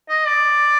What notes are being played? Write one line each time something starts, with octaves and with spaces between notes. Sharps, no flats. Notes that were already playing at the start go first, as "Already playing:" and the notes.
D#5
D5